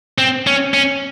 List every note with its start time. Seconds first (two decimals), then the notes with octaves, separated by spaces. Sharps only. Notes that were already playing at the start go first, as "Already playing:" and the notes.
0.18 C4
0.47 C#4
0.74 C#4